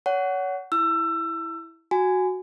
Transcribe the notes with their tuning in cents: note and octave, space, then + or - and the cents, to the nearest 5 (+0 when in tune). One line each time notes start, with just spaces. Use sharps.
C#5 +30 F#5 +10
E4 +0 E6 +25
F#4 +0 G#5 +0